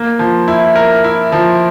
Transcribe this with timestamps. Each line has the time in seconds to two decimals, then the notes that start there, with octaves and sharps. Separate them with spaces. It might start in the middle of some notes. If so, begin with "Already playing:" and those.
Already playing: A#3
0.19 F3
0.48 E4
0.76 A#4
1.04 E4
1.32 F3